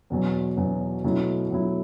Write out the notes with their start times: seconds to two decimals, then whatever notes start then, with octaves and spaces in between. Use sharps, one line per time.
0.10 E2 B2 F#3
0.57 E2 B2 F#3
1.04 B2 F#3 A3 E4
1.51 B2 F#3 A3 E4